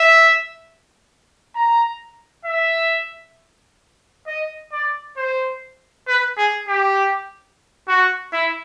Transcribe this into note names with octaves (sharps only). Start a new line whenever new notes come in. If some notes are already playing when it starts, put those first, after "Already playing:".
Already playing: E5
A#5
E5
D#5
D5
C5
B4
G#4
G4
F#4
E4